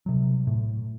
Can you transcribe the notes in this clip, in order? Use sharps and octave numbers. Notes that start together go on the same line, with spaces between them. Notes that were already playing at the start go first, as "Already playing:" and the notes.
C3 F#3
A2